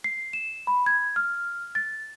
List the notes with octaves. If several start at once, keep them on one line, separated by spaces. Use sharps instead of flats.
C7
E7
B5
G#6
F6
A6